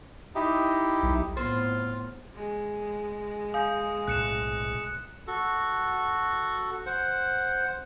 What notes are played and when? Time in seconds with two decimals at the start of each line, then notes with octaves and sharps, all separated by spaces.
0.35 D#4 E4 G4
1.03 B1
1.37 A2 B3 C4 F4
2.35 G#3
3.54 F5 G#5 D#6 G6
4.08 B1 A2 C3 F#6 C#7 E7
5.27 F#4 A4
6.86 C5 F#5